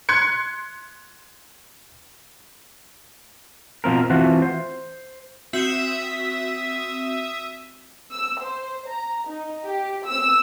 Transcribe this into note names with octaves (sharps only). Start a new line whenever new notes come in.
C6 F#6 G#6 C#7
B2 F3 C4 A#4
E3 A3 C4 F4 F#4
C5
C4 F#4 E5 D#6
E6
C5
A#5
D#4
G4
E6